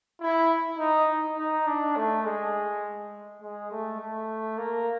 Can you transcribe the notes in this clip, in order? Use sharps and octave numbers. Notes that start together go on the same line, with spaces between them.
E4
D#4
D#4
D4
A3
G#3
G#3
A3
A3
A#3